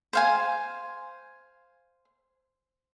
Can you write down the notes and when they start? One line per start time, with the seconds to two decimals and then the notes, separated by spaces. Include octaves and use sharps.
0.13 C5 F5 G#5